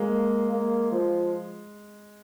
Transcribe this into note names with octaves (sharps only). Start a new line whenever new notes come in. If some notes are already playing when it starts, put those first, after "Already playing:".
Already playing: G#3 A#3
A#3
F3